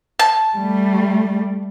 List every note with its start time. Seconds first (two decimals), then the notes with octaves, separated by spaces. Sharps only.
0.19 A5
0.56 G3 A3